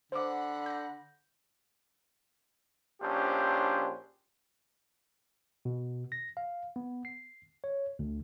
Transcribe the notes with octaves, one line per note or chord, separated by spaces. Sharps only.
D3 C5 F#5 B5 D6
G6 A#6
A#1 C#4 D4 G4 C5
B2
A#6
F5
B3
C7
C#5
D2